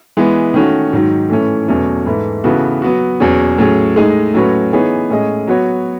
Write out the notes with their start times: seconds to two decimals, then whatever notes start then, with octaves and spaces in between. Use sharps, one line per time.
0.17 E3 G#3 B3
0.54 D#3 A3 C#4 F#4
0.93 G#2 D#3 F#3
1.30 A2 E3 A3 C#4
1.68 E2 B2 F#3 A3 C#4
2.06 G#2 E3 A3 E4 B4
2.44 C#3 E3 B3 F#4 A4
2.82 F#3 B3 F#4
3.20 E2 B2 F#3 C#4 G#4
3.58 A2 F#3 C#4 G#4
3.96 A2 G#3 D#4 G#4 D#5
4.34 A2 F#3 C#4 F#4 B4
4.73 E3 B3 D#4 G#4 C#5
5.10 A2 G#3 C#4 G#4 D#5
5.47 F#3 B3 F#4 C#5